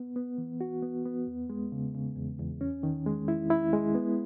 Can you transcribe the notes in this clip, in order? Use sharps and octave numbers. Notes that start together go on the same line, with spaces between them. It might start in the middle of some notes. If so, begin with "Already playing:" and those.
Already playing: B3
B3
E3
F#4
B3
B3
E2
G#3
C#3
C#3
E2
E2
C#4
D#3
G#3
E4
E4
G#3
B3